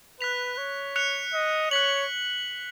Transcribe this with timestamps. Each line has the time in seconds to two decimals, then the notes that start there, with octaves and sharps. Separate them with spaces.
0.21 B4 F#6 B6 F7
0.58 C#5
0.96 F#6 C#7 F7
1.33 D#5
1.71 C#5 F#6 B6 F#7